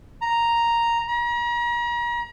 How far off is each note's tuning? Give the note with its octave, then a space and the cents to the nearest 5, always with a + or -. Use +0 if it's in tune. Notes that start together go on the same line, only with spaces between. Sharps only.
A#5 +0
A#5 +40